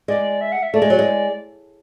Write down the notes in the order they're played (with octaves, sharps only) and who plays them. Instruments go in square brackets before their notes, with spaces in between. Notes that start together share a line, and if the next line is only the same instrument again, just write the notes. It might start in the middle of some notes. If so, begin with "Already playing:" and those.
[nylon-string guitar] G#3 [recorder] D5
[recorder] E5
F#5
E5
[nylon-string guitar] A3 [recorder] D5
[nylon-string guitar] G#3
F#3
G#3